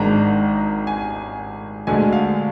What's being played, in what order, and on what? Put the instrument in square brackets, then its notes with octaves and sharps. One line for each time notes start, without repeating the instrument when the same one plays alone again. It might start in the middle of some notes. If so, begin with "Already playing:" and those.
Already playing: [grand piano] G#1 G#2 D#3 G#3 D4 A#5
G#5
D2 D3 G#3 G#5
F5